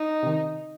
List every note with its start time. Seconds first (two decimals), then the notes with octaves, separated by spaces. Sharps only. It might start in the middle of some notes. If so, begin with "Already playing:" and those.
Already playing: D#4
0.23 C3 D#3